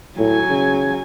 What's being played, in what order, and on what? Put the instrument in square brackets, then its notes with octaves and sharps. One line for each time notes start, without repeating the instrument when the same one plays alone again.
[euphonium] A2 [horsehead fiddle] F#3 G#5
[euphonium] C#3